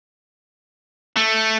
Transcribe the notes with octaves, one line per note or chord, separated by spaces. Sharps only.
A3